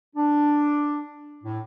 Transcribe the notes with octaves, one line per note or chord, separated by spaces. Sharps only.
D4
A2